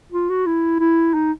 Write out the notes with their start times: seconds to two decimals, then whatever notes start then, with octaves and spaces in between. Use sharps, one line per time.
0.12 F4
0.30 F#4
0.46 E4
0.80 E4
1.14 D#4